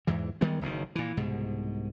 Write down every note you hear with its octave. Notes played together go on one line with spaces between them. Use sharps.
E2 G#2 E3
D#3 G3 G#3 B3
F#1 B1 B2 D#3
A#2 E3
C2 G#2 B2